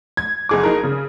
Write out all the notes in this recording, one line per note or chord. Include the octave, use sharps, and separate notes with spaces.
G#6
F#1 G#4 D6
D#4 G#4 A#4
C#3